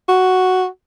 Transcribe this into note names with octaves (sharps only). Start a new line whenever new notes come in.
F#4